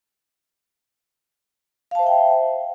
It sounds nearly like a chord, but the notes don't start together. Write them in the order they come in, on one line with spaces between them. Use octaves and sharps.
F5 A5 C5 E5 G5